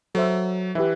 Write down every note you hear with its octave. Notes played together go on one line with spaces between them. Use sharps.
F#3 A4 C5 E5
E3 G4 B4 E5